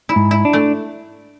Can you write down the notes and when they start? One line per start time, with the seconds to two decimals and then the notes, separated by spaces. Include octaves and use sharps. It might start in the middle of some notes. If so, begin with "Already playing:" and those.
0.09 E4
0.16 G#2
0.31 E4
0.45 D4
0.53 A3